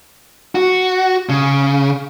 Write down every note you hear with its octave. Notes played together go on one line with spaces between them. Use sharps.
F#4
C#3